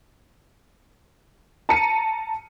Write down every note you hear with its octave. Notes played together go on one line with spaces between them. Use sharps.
A5 A#5 C#7 D#7